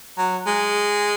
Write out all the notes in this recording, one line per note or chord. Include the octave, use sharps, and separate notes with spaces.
F#3
G#3